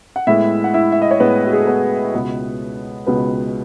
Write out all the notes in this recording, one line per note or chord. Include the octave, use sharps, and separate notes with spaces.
F#5
A2 G#3 B3 E4 E5
F#5
E4 E5
E5
D#5
C#5
A2 G#3 B3 B4
F#4
G#4
A4
B3 B4
C#2 B2 G#3 B3
C#2 B2 G#3 B3 B4